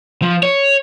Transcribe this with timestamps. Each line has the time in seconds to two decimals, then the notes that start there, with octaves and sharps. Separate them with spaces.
0.22 F3
0.43 C#5